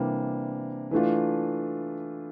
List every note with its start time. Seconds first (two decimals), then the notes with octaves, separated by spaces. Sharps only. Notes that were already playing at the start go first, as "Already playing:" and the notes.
Already playing: C3 E3 G3 A#3 D4
0.91 E3 A3 D4 F4